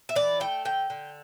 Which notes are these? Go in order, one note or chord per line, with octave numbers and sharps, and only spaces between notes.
E5
E3 D5
A3 G5
D3 G5
D3